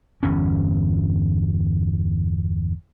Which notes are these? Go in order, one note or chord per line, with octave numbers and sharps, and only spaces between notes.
G1 E2 G2 C#4